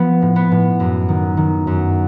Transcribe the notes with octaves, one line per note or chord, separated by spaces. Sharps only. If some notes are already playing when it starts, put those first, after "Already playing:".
Already playing: F3 B3
A2
B3
A2
F#2
D#3
D#3
F#2